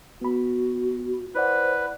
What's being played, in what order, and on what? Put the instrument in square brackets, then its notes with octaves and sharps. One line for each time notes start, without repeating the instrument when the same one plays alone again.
[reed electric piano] B3 B5 [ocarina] F#4
[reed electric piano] E4 D5 F#5 [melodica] B4 [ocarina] C5